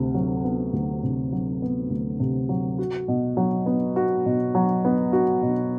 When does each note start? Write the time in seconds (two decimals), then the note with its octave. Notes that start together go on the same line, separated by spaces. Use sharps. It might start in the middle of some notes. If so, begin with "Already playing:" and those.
Already playing: D2 C3
0.14 F#3
0.44 B3
0.73 D2
1.03 C3
1.32 F#3
1.62 B3
1.90 D2
2.20 C3
2.49 F#3
2.78 F#4
3.08 B2
3.37 F#3
3.66 B3
3.96 F#4
4.26 B2
4.55 F#3
4.85 B3
5.13 F#4
5.42 B2